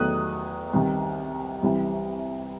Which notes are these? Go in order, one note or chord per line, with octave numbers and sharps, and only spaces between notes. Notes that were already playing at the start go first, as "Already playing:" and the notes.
Already playing: E2 D#3 F#3 A3 D#6 F#6
C2 C3 D#3
C2 C3 E3 G3